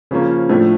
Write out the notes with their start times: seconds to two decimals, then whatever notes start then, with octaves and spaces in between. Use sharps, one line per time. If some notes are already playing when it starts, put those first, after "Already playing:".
0.11 C#3 F3 A#3 C#4
0.50 A2 F3 A3 D4